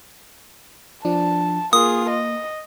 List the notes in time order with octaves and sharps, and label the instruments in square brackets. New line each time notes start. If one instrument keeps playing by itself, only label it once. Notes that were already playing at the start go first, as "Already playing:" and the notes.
[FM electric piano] F3 D4 [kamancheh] A5
[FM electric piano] A#3 [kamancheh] F4 G#4 [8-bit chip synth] D#6
[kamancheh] D#5